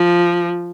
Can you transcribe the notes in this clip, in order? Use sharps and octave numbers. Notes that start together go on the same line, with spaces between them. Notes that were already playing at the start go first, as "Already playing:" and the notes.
Already playing: F3